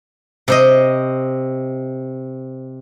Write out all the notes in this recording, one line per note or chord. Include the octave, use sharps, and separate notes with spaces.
C3 C5 D#5